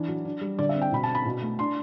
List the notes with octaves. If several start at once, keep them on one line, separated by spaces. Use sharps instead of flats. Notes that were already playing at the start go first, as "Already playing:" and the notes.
Already playing: E3 D4
F#3
D4
G3
D3 D5
E5
C4
G5
B2 B5
A5
D4
B5
B2
A3
D4 C6